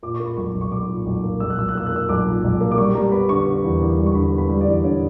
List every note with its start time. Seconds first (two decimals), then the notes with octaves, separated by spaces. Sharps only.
0.03 A#2 D6
0.15 C#6
0.20 A#3
0.26 B5
0.37 B1 C#6
0.55 B1
0.61 C#6
0.71 B1 D6
0.89 A#2
1.06 B1
1.23 A#3
1.40 B1 E6
1.50 F#6
1.58 B1 E6
1.69 F#6
1.75 A#3 E6
1.86 F#6
1.92 A#3 E6
2.09 B1 D6
2.26 A#2
2.44 B1
2.61 A#3
2.72 D6
2.78 G3 C#6
2.95 G3 A#5
3.12 B3 B5
3.29 D3 C#6
3.46 B3
3.64 E2
3.81 E2
3.98 G3
4.06 C#6
4.15 D3 B5
4.32 B3
4.38 B5
4.49 G3
4.61 D5
4.66 E2
4.84 D3 C#5